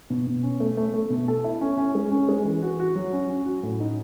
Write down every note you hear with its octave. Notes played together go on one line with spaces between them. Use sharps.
B2
B2
C#4
A3
A3
A3
B2
A4
E4
C#4
C#4
G#3
C#4
G#3
E3
F#4
F#4
F#3
C#4
C#4
F#4
A2
D#4